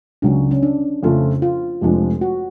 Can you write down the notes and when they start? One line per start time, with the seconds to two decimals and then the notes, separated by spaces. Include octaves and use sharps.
0.22 C#2 C#3 F#3 C#4 D4 F#4
0.51 C#4
0.63 D4
1.03 F2 C#3 F3 A3 F4
1.42 F4
1.81 F1 F2 F3 G#3 D4
2.21 F#4